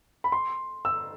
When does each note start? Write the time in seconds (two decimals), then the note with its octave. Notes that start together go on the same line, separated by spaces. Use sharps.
0.24 B5
0.32 C6
0.85 E6